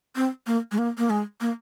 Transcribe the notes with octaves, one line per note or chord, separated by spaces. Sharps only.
C4
A#3
G#3
A#3
A#3
G#3
A#3